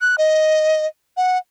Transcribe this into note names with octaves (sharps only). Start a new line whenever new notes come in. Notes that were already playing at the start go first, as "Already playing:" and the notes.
F#6
D#5
F#5